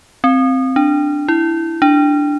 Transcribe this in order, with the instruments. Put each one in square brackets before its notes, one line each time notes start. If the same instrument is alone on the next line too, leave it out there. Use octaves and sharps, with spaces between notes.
[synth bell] C4
D4
E4
D4